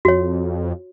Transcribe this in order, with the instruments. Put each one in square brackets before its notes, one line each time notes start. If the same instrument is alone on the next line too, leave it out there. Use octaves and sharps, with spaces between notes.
[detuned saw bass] F2 [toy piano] F#4 C#5